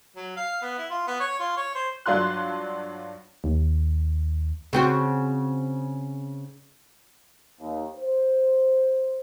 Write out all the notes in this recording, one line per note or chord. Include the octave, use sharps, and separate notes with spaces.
F#3
F5
B3
E4
F4
B3
C#5
F4
C#5
C5
G2 F#3 D4 F4 C6 F#6
D#2
C#3 C4 F#4
D#2
C5